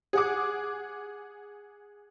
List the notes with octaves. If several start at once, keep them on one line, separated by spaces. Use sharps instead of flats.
G#4 F#5 D6